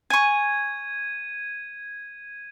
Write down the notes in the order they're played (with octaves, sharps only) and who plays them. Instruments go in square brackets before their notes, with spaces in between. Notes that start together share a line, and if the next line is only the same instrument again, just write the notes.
[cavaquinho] G#5 C#6 [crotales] G#6 D#7